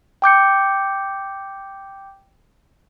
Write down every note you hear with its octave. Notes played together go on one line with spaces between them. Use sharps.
G5 D6 G6 C#7